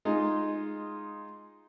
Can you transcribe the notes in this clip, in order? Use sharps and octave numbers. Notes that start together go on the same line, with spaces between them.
G#3 D#4 F4